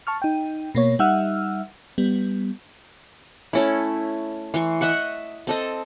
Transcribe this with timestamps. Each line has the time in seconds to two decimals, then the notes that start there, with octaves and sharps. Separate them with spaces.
0.07 A5 C#6 F6
0.22 D#4 G5
0.75 B2 A#3 C#5
0.99 G3 D#4 E5 F#5 E6 F6
1.98 G3 B3
3.53 A3 C#4 E4
4.54 E3 C6 C#6
4.81 D#5 E5 F#5 C#6
5.47 C4 A4 D#5